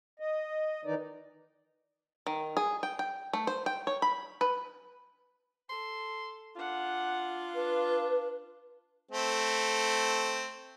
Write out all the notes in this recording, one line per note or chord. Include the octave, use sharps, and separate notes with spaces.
D#5
D#3 E3 D#4 D5
D#3
G#4
G5
G5
A3
C5
G5
C#5
B5
B4
A4 C6
D4 F4 F#5
D4 B4
A3 C4